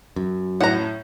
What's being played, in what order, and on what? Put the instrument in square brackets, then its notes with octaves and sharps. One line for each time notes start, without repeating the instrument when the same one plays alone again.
[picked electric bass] F#2
[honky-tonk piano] A2 [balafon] C#5 [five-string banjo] F#5 A#5